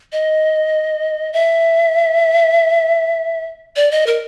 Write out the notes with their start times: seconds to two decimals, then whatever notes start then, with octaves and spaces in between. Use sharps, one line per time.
0.12 D#5
1.33 E5
3.76 D5
3.91 D#5
4.07 A#4